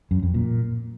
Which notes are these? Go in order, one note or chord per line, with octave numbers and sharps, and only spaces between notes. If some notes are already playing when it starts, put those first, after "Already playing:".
F#2
F2
A#2